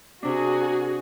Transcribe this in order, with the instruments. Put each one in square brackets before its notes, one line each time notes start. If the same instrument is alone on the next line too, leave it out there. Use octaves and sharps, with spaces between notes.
[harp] C3 D4 [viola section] F#4 G#4